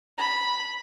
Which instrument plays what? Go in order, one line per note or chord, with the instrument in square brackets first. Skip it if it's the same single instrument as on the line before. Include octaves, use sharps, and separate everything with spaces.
[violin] B5